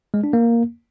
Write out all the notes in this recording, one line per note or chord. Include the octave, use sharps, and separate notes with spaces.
G#3
D4
A#3